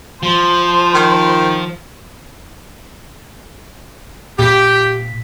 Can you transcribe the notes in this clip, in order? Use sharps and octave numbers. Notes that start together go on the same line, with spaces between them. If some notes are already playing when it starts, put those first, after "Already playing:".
F3 C5
D#3
A#2 G4 B6